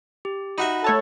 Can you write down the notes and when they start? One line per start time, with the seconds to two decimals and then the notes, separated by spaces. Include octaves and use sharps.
0.25 G4
0.58 D#4 F#4 E5 B5
0.84 A3 A4 C#5 A5